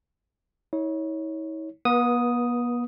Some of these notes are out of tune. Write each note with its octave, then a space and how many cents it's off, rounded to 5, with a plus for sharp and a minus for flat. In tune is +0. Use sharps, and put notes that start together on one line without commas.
E4 -45 C#5 +0
B3 -45 B4 -20 D#6 +0